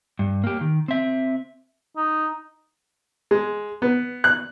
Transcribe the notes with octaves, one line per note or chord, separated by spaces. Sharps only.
G2
A#3 G4
D#3
C4 E5
D#4
G#3
B3
F#6